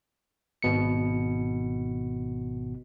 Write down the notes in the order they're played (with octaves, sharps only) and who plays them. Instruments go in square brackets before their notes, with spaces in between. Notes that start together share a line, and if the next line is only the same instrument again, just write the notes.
[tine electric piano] G#1 B2 C#7